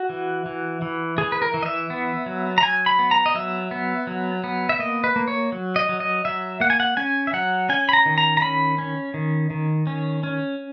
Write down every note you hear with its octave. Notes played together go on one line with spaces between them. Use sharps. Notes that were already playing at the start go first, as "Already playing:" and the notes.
Already playing: F#4
E3
E3
E3
E3 G#4
B4
A#4
E3
D#5
E5
B3
F#3
A#5
F#3 G#5
B5
B3
A#5
D#5
F#3 E5
B3
F#3
B3
E5
A#3 D#5
B4
A#3
C#5
F#3
D#5
F#3
D#5
F#3 E5
A#3 F#5
G#5
F#5
C#4 G#5
E5
F#3 F#5
C#4 G#5
B5
A#5
D#3
A#5
A#5
C#4 B5
C#4
D#3
D#3
C#4
C#4